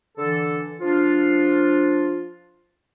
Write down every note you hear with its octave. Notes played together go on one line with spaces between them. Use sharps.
D3 E3 A4
F3 D4 F4